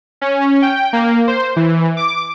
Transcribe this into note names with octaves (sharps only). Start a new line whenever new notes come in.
C#4
G5
A#3
C5
E3
D6